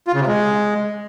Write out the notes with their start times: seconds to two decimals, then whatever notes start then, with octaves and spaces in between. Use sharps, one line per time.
0.07 F4
0.14 C#3
0.20 C3
0.27 G#3